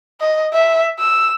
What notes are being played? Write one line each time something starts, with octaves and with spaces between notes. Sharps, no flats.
D#5
E5
E6